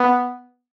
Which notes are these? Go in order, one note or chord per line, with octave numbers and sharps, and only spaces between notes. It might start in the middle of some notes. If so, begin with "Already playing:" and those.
Already playing: B3